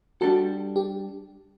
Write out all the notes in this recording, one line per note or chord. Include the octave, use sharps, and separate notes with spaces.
G3 D4 F#4 A4
G4